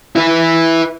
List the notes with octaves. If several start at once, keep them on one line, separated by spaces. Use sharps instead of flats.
E4 B4